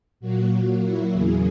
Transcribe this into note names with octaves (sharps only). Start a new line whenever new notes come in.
A#2 F#3 A#3 F#4
F#4
E4
E2 C#3 F#3 A#3 G#4